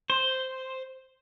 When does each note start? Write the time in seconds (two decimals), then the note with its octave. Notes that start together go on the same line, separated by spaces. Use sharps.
0.10 C5